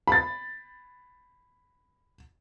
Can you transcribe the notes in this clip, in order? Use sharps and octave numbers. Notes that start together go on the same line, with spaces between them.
B5 A6